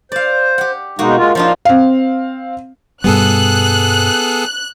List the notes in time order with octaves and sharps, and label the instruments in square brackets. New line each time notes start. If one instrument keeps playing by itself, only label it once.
[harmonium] C5 [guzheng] D5 F5
[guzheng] G4 F#5
[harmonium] B2 G#3 D#4 [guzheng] A#3 F#4
[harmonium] G#3 F4
[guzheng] F3 D4 D#4 [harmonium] F4
[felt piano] C4 F5
[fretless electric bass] G2 B2 G3 [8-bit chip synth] B3 G#4 A4 [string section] F#6